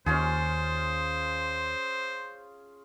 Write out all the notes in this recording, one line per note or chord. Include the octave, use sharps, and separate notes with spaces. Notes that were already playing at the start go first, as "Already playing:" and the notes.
D#2 C#4 F4 G#4 C5